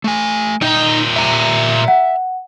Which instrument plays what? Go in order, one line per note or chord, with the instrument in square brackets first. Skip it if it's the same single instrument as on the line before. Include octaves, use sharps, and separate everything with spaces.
[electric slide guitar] A3 G#5
[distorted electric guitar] A#2 G5 [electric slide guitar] D#4 D#5 A#5
[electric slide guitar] E5 A#5
[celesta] F#5